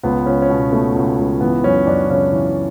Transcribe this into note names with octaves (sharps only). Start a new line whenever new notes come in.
C#2 B3
C#2 C#4
C#4
B2 B3
B2 A3
C#2
C#2
E3 B3
F#2 C#4
F#2 D4
C#3 C#4
E3